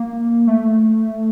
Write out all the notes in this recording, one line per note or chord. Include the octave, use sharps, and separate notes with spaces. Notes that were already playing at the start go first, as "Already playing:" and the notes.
Already playing: A#3
A3